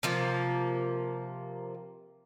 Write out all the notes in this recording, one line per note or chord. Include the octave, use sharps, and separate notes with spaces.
C3 F3 A#3